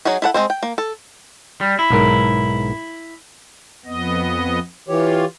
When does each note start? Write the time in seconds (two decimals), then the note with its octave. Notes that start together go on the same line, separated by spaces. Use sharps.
0.05 F#3 D#4 F#4 G#4
0.22 E4 A4 F#5
0.34 G#3 C4 C5
0.50 G5
0.63 A#3
0.78 A4
1.61 G3
1.79 E4
1.90 B1 G#2 A#4
3.85 F2 B3 D#5
4.88 E3 F4 G4 C#5